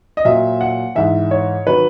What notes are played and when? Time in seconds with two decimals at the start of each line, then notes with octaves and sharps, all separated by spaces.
0.17 D#5
0.25 A#2 F#3 E5
0.61 F#5
0.95 G#2 E3 E5
1.31 C#5
1.67 D#3 F#3 B4